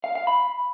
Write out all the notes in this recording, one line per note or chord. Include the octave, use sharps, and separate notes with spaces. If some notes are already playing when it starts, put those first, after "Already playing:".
F5
F5
B5